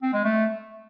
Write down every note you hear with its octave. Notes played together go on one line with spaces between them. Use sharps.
C4
G#3
A3